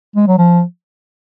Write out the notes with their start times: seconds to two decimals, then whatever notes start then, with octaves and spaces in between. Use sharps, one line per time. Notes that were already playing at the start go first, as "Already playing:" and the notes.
0.16 G#3
0.27 F#3
0.39 F3